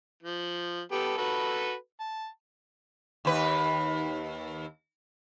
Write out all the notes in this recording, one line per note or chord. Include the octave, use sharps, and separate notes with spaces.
F3
B3 G4 A4
F#4 A4 B4
A5
D#2 B4